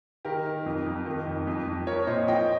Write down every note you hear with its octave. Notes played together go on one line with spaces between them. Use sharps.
D#3 G4 A#4
D#3
F2
F2
D#3
F2
F2
F2
F3 A#4 C#5
A#2 C5 D#5
F3 D#5 G5